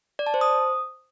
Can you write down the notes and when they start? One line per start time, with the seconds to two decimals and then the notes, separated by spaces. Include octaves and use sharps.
0.19 D5
0.27 A5
0.34 C5
0.41 D#6